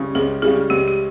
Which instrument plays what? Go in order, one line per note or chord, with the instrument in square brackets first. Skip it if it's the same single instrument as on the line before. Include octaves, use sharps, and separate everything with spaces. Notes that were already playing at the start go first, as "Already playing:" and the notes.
Already playing: [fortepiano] C#2 C#3 G3
[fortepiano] C#2 [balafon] G#4
[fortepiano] C#3 G3 [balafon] G#4
[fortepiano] C#2 [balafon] G4
[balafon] G4